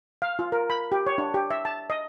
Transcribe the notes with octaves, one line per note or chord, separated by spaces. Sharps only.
F5
F4
A#4
B5
G4
C#5
D4
G4
E5
A5
D#5